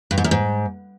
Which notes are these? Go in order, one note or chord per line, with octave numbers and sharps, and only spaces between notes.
G2
G#2
F#2
G#2